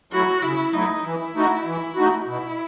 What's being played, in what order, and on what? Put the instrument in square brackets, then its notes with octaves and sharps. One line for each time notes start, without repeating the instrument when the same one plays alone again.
[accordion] F#3 A3 E4 [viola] F#4
[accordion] C#3 [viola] E4
[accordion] F#3 A3 E4 [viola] D#4
[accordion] E3 [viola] E4
[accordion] A3 D#4 F#4
E3
A3 D#4 F#4
[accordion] B2 [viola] E4